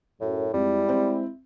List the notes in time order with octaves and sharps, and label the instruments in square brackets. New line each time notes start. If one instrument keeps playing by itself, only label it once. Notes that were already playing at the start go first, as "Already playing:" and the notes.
[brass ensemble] F#2 [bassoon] A2
[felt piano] F2 [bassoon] G3 [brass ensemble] G#3 E4
[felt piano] C4